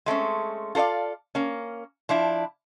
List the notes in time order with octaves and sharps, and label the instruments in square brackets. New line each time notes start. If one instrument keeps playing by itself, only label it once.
[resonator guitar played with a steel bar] G#3 A3 C4 C#4
F4 A4 C5 D5 F5
A#3 C#4
F3 D4 E4